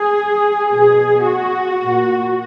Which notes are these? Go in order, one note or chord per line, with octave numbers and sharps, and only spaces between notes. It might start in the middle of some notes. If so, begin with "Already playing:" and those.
Already playing: G#4
B2 G#4
F#4
A#2